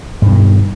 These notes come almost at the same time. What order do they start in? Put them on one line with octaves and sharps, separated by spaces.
G2 B2 D#3